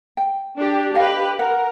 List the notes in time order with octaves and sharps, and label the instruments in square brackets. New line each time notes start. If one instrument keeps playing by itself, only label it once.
[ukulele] G5
[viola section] D4 G4
[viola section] G4 B4 [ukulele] D#5 F5 G5
[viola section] A#4 [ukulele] F#5